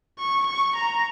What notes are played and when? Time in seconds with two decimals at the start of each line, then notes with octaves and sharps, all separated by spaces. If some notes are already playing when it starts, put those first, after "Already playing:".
0.19 C#6
0.47 C#6
0.76 A#5